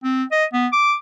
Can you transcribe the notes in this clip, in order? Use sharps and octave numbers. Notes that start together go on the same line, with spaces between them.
C4
D#5
B3
D6